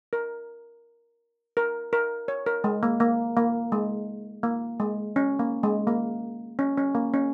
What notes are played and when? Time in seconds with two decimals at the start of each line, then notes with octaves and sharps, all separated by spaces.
0.13 A#4
1.57 A#4
1.93 A#4
2.28 C#5
2.46 A#4
2.64 G#3
2.83 A#3
3.00 A#3
3.37 A#3
3.72 G#3
4.43 A#3
4.80 G#3
5.16 C#4
5.39 A#3
5.63 G#3
5.87 A#3
6.59 C#4
6.77 C#4
6.95 A#3
7.14 C#4